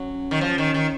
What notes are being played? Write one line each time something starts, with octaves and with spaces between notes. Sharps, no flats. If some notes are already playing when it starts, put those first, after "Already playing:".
Already playing: F#3 C#4
D#3
F3
D#3
D#3